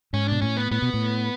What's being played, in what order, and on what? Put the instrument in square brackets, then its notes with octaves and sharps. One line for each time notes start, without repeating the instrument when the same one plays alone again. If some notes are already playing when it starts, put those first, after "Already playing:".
[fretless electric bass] G#2 [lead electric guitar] C#4
[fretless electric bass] B2 [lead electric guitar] D4
[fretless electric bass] A2 [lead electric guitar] C#4
[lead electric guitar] B3
[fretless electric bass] A2 [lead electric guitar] B3
[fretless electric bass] B2
A2